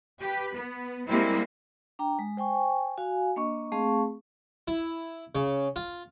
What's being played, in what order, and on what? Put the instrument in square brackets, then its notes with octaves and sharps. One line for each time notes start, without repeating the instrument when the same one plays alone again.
[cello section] G4 B4
B3
G3 G#3 A#3 C4 E4
[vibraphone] D4 G5 A#5
G#3
C5 G5 G#5 C#6
F#4 F5 G#5
A#3 D4 D#5 C#6
A3 C4 G#4 F5 A5 C#6
[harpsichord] E4
C#3
F4